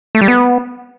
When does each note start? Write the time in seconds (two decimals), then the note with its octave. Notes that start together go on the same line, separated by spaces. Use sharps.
0.15 A3
0.21 G3
0.28 B3